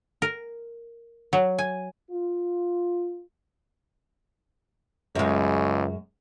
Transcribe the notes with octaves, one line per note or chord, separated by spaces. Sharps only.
A#4
F#3
G#5
F4
C#2 F#2 G#3